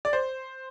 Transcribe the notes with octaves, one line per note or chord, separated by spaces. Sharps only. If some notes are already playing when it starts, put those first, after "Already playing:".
D5
C5